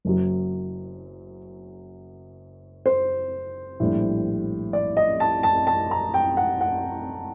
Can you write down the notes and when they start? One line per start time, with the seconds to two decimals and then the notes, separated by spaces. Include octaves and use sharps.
0.05 F#1 F#2 F#3
2.86 C5
3.80 A#1 A2 G3
4.73 D5
4.97 D#5
5.20 A5
5.43 A5
5.67 A5
5.91 A#5
6.14 G5
6.37 F#5
6.61 F#5